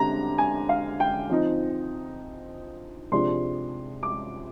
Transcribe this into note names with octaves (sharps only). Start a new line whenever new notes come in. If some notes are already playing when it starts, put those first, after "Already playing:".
Already playing: D3 G3 C4 A#5
G#5
F5
G5
F3 C4 D#4
C3 F3 G#3 D4 C6
D6